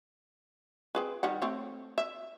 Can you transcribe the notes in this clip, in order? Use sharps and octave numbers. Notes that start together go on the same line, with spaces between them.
C4 G#4 B4
D#3 G3 F#5
A3 C4 C#5
E5